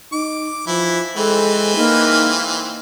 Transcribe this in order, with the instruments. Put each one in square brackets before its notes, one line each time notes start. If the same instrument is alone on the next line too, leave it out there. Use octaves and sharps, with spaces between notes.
[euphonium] D#4 [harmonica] D6
[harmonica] E3 E4 [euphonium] F3
[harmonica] E3 C4 B4 [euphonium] G#3 [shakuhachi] A4
[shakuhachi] A#3 [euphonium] D#4